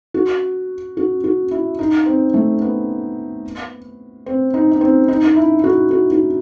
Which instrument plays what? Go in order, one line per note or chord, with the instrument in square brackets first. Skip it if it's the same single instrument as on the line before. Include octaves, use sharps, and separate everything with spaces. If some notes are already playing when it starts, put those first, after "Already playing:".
[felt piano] F#4
F#4
F#4
E4
D#4
C4
A3
B3
C4
D#4
D#4
C4
D#4
D#4
E4
E4
F#4
F#4
F#4